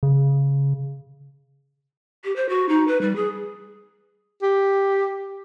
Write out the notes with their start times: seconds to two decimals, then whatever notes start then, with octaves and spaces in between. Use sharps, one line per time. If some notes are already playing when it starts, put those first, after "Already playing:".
0.03 C#3
2.24 G4
2.36 C5
2.49 F#4
2.69 D#4
2.88 B4
3.01 G3
3.16 G#4
4.43 G4